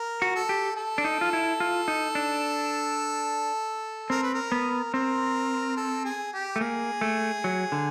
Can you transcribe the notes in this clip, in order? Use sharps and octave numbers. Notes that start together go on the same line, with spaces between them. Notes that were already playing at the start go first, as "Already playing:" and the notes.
Already playing: A#4
F#4
A4
G4
A4
D4
D#4
F4
E4
F4
D#4
D4
C4 A#4
B4
A#4
B3
C4 A#4
A4
G#4
G4
A3
A#3 G#4
A3
F#3
D3